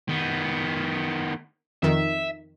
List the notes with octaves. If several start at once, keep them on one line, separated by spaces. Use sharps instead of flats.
D#3 B3
F2 D#3 E5